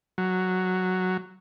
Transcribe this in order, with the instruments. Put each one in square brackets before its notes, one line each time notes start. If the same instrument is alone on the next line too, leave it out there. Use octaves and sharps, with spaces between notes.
[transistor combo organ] F#3